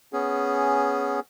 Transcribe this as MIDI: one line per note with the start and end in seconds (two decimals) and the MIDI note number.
0.13 1.20 59
0.13 1.20 61
0.13 1.20 68